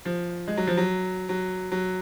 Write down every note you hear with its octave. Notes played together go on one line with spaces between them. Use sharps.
F3
G#3
F#3
F3
F#3
F#3
F#3